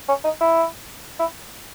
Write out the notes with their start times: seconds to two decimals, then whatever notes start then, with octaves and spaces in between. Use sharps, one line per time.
0.08 C#4
0.24 D#4
0.41 E4
1.19 E4